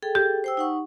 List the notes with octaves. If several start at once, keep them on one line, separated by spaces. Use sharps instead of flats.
G#4 A4 G5
G4
C5 G5 E6
D#4 F#5 C#6